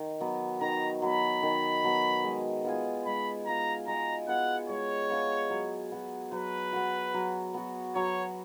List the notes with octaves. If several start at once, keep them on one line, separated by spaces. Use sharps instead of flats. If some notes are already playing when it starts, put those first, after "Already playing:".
Already playing: D#3
F#3 B3
D#3 A#5
F#3 B3 B5
D#3
F#3 B3
G#3
B3 F4 G#4
G#3 B5
B3 F4 G#4 A#5
G#3 A#5
B3 F4 G#4 F#5
G#3 C#5
B3 F4 G#4
F#3
B3 F#4
F#3 B4
B3 F#4
F#3
B3 F#4
F#3 C#5